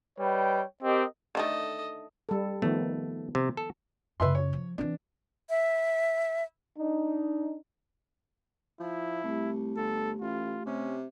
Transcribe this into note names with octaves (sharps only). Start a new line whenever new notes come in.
G3 B4 C#5 D#5 G5
C4 G4 A#4 D#5
D3 D#3 A3 A4 D#5
G3 A4
D#3 F3 A3 B3
C3
A4
F#2 C#3 B4 E5 C6
C#5
F3
E3 C4 D4
E5
D4 D#4
F3 E4
C2 A3 G4
G1 A4
A1 F4
C3 C#4